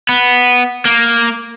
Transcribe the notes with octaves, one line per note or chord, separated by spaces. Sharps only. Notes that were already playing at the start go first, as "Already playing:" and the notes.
B3
A#3